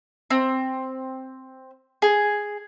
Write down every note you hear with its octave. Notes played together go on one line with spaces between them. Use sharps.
C4
G#4